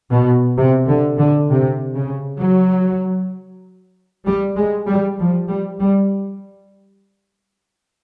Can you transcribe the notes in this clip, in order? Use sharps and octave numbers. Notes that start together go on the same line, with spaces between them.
B2
C3
D3
D3
C3
C#3
F#3
G3
G#3
G3
F3
G3
G3